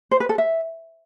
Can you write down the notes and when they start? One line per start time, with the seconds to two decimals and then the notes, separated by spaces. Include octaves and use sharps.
0.11 C5
0.20 B4
0.29 A4
0.38 E5